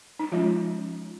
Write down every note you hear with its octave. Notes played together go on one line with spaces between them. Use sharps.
D#4
F3 G#3 C#4 F4